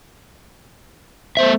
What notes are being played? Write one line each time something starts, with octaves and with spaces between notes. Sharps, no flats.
A3 B3 C5 E5